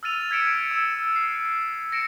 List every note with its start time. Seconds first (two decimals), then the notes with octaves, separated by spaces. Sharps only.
0.03 E6 F6 A6 D#7 F7
0.31 G#6 B6 C#7 D7 E7
0.71 E6 E7
1.16 C7
1.92 A#6 C#7 D7 E7